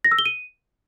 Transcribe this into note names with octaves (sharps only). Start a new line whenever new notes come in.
A#6
E6
G7
D#7